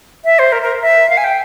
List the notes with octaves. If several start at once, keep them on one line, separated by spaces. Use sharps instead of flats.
E5
C5
A#4
A#4
E5
F5
G#5
G5